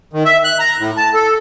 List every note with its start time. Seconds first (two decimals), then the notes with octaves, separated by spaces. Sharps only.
0.13 D#3
0.25 E5
0.44 F#6
0.59 A#5
0.79 A2
0.97 A5
1.14 A4